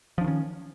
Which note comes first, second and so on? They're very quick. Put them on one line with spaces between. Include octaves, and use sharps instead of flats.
F3 D4 D#3 C#4